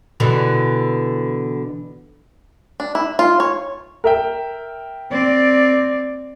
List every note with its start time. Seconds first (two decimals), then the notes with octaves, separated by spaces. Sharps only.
0.20 B2 D3 E3
2.80 D4
2.95 E4
3.19 F4
3.40 C#5
4.04 A#4 E5 G5
5.11 C4 D5